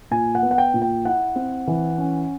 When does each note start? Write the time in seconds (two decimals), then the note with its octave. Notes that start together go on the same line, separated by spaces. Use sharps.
0.11 A#2 G#5
0.35 F#5
0.43 B3
0.51 F#5
0.58 G5
0.74 A#2
0.82 G5
1.05 E4 F#5
1.36 C4
1.67 E3
1.98 C#4